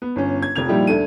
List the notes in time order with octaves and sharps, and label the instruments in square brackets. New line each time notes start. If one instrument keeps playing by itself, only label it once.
[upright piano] B3
G1 C#4
G#6
F1 F2 G#6 F7
A#2 F3 G3 D#4 E4 G4
D2 D4 A4 D#7